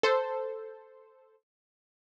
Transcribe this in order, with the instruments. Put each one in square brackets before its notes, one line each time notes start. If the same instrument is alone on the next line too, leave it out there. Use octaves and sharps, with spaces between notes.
[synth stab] A4 C5